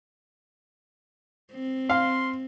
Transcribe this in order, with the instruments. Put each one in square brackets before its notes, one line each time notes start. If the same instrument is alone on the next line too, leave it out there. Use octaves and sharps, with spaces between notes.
[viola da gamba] C4
[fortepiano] F5 [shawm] C6